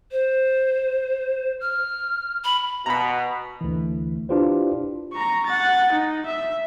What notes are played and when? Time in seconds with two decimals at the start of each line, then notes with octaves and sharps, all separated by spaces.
0.12 C5
1.61 F6
2.44 B5
2.86 B2 A#5 B5
3.61 D2 E3
4.29 D4 E4 F4 G4 B4 C5
5.13 A#5 C#6
5.46 F#5 A6
5.93 D#4
6.26 E5